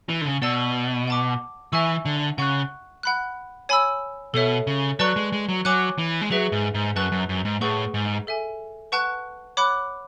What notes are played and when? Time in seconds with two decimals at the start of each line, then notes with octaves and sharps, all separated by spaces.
0.09 E3
0.21 D3
0.25 C#3
0.42 B2 D5 A5 E6
1.08 F#5 A5 D6
1.72 E3 E5 G#5 C#6 E6
2.05 D3
2.38 C#3 F#5 C#6 F#6
3.03 F#5 B5 F#6
3.69 C#5 G#5 B5 E6
4.34 B2 A4 C#5 E5
4.67 C#3
4.99 F#3 B4 D5 A5 C#6 F#6
5.16 G#3
5.33 G#3
5.49 F#3
5.65 F#3 C#5 G#5 D6 F#6
5.98 E3
6.21 G#3
6.31 F#3 G#4 B4 E5
6.52 G#2
6.74 G#2
6.96 F#2 B4 F#5 A5 C#6 F#6
7.12 F#2
7.29 F#2
7.45 G#2
7.61 A2 G#4 B4 F#5 C#6
7.94 G#2
8.27 A4 E5 G#5
8.92 B4 F#5 A5 C#6 F#6
9.57 C#5 F#5 B5 D6 F#6